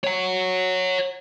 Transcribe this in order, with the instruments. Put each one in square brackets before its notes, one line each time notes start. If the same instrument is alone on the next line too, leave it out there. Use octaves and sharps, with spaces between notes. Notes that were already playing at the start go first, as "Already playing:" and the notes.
[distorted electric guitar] C#5 F#5